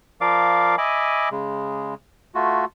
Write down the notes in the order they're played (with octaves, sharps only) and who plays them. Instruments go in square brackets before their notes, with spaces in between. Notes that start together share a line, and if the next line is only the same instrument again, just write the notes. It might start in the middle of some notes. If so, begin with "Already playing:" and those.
[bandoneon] F3 A#4 D5 F5 D6
D#5 E5 G#5 B5 D6
C#3 G#3
A3 F4 F#4